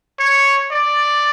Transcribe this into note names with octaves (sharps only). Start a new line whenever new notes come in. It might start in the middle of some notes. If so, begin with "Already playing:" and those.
C#5
D5